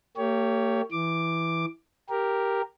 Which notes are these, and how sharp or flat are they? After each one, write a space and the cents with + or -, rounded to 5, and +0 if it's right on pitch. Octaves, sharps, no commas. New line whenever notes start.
A#3 -40 G4 +0 C#5 +15
E3 +0 D6 +5
G4 +0 A#4 +0